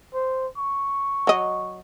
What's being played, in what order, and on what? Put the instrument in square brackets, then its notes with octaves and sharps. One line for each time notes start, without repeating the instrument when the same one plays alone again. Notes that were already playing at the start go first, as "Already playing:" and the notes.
[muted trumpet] C5
C#6
[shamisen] F#3 D#5